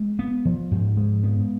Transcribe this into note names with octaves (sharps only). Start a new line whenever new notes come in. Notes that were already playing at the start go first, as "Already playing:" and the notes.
Already playing: G#3
B3
F3
G#2
G#3
B3